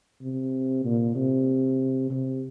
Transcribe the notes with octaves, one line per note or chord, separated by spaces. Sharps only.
C3
A#2
C3
C3